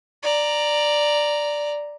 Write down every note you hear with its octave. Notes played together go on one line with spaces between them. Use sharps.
D5 A#5